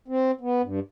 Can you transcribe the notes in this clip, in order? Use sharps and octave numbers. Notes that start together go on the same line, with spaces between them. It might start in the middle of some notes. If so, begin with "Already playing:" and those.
C4
B3
G2